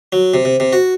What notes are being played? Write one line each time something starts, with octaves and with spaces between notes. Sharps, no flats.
F#3
C3
C3
C3
F#4